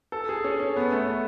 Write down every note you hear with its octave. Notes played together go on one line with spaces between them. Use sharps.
A4
G#4
C#4
C#4
B3
A3
A3